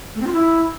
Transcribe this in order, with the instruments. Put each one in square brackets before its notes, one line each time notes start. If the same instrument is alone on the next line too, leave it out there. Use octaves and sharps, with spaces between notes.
[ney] A3
C4
F4
E4